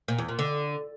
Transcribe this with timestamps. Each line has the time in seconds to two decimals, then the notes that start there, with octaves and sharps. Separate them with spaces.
0.08 A#2
0.18 E2
0.29 A#2
0.39 D3